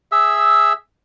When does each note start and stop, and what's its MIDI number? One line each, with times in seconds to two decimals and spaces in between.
0.12 0.73 68
0.12 0.73 76
0.12 0.73 88